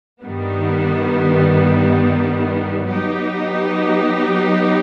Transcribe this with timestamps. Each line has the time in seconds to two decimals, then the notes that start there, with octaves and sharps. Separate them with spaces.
0.22 G2 D#3 G3 B3
2.90 F#3 B3 D#4 G4